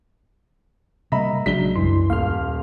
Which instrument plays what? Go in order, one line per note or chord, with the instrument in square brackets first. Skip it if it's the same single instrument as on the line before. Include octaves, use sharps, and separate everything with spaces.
[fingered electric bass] C3 G3 A#3 [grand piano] D#5 E5 B5 [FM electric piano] A#5
[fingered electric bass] A#1 C#3 [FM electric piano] F#3 G#3 D4 [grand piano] B6 G7
[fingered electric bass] C2 F#2 [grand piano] E3 [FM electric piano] C6
[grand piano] D#1 [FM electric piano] F5 C6 F6